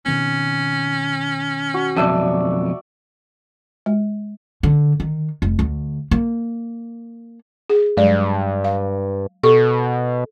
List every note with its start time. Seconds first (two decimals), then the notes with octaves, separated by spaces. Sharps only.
0.06 B2 D#3 C4 C#4
1.74 F#4
1.96 B1 F2 D5 E5 A5
3.86 G#3
4.63 D3
5.00 D#3
5.42 F1
5.59 D2
6.11 A#3
7.69 G#4
7.97 G2 F#3 G#3 D5
8.64 F5
9.43 B2 G4 A4 C#6